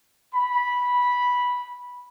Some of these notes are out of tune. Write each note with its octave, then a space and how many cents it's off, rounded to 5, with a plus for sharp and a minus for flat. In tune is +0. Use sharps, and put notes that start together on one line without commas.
B5 -10